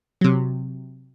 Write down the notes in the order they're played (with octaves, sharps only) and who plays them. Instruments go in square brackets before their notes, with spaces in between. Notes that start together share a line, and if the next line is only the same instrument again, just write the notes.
[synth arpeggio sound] C3 F#3